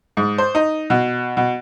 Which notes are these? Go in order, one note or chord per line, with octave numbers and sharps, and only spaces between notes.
G#2
C5
D#4
B2
B2